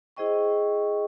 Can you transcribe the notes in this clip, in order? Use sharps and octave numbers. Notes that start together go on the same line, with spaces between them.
E4 G#4 C5 D#5 G5 C#6